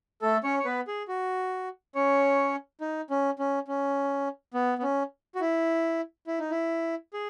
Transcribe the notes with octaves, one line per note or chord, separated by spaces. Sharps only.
A3 A4
C#4 C#5
C#5
B3 B4
G#4
F#4
C#4 C#5
D#4
C#4
C#4
C#4
B3
B3
C#4
F#4
E4
E4
D#4
E4
G#4